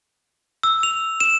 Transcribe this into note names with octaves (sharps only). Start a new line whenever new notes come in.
E6
F7
E7